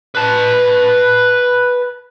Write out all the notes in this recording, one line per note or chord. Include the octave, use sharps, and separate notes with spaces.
B4 A5